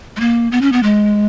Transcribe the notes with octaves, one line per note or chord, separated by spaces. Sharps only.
G#3
A#3
B3
C#4
B3
G#3